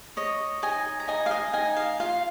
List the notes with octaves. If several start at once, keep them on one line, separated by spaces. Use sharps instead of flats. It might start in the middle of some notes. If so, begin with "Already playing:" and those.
C#5 D#5
D#4 D#5 G#5
A#5
D#4 D#5 G#5
F5
D#5 G#5
D#4 D#5 G#5
F5
F4 F5